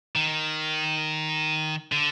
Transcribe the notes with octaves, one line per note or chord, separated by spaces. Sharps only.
D#3
D3